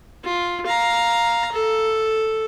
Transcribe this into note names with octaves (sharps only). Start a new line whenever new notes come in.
F4
F5 A#5
A4